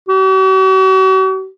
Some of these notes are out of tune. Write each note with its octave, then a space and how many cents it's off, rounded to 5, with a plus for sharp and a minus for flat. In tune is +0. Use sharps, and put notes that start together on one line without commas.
F#4 +45